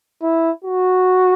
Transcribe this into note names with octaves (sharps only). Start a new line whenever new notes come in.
E4
F#4